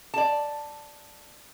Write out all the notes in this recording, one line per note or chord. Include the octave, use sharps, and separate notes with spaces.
D5 A5